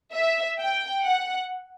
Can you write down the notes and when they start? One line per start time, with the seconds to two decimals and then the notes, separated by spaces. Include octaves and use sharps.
0.13 E5
0.59 G5
1.04 F#5